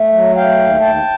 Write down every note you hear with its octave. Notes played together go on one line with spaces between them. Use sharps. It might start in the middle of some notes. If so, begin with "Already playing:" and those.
Already playing: A3
F#3
A3 F5 G5
D#2
D#2 G5 A5